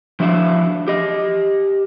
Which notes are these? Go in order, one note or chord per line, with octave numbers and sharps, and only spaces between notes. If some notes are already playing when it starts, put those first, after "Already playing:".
F3 D4 E4 F#4 E5 F5
G4 D#5